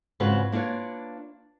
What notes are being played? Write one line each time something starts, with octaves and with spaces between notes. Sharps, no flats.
G#2 C#3 C4 F4 F#4 B4
A#3 D4 F4 B4 C#5